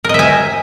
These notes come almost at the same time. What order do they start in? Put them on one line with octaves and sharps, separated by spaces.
A#4 D#5 E5 G#5